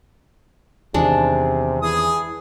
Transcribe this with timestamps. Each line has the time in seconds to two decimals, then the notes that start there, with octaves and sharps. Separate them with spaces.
0.94 E2 C3 D#3 G#3 D4
1.82 E3 G#4 D#6